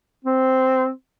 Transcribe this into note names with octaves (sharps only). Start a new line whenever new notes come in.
C4